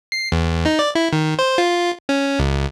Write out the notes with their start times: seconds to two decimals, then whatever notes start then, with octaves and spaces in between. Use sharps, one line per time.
0.12 C7
0.32 E2
0.66 D#4
0.79 D5
0.95 E4
1.13 D#3
1.39 C5
1.58 F4
2.09 C#4
2.39 C#2